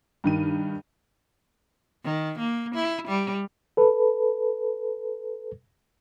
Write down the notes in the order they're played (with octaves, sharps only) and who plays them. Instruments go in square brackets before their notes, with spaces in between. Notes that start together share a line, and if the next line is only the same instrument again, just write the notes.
[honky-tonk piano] G2 D#3 D#7
[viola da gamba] D#3
A#3
E4
G3
[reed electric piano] A4 B4